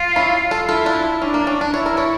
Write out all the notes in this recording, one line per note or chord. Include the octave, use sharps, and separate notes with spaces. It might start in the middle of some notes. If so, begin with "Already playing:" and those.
Already playing: F4
C#4 E4
F4 A4
E4 F4 A4
D4 F4
C#4 D4
A#3
C#4
D4
E4 C#5
A#4
A4 C#5